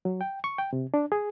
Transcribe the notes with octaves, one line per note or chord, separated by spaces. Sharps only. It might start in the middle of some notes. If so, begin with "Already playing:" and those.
F#3
G5
C#6
G5
C3
D4
G#4